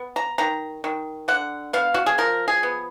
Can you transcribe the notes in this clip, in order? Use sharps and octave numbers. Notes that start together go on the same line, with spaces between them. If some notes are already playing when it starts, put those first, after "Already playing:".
Already playing: B3
A#5
D#3 A#5
D#3
D3 F#5
B3 F5
F#4
G#4
F3 A#4
G#4
B3